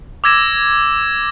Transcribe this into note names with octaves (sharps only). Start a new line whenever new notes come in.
D6 E6 G#6 A#6 E7